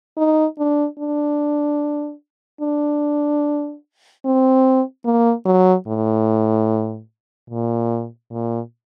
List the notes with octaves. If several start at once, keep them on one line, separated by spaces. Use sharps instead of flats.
D#4
D4
D4
D4
C4
A#3
F#3
A2
A#2
A#2